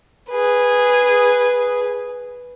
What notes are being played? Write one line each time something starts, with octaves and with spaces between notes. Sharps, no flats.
G#4 B4